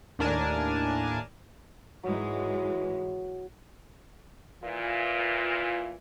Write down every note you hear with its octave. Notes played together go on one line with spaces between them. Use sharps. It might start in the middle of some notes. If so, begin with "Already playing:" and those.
D#2 A2 D4 A#4 G#5 A5
G#2 E3 F#3 G#3
A#2 E3 F4